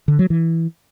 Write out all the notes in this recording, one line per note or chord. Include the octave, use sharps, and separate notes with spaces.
D3
F#3
E3